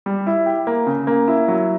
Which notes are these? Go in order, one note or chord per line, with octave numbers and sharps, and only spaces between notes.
G3
E4
G4
A#3
C#3
A#3
E4
F#3